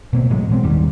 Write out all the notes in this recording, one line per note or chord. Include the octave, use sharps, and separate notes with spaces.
B2 A#3 C4
A2 E3 F#3 G#3
B2 G#3 C4
G1 D#2 D#3 G3